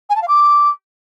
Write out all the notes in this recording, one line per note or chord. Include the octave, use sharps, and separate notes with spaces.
G#5
A5
F5
D6